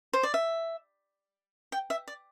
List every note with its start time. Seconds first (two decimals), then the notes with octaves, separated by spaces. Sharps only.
0.13 C5
0.23 D5
0.34 E5
1.72 G5
1.90 E5
2.08 D5